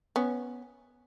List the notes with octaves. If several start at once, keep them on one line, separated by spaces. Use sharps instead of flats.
B3 C#4